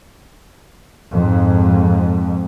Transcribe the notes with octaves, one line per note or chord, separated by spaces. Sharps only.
F2 G#2